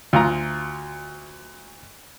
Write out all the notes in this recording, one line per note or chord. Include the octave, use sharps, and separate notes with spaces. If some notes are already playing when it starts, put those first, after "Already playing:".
D2 F4 A#5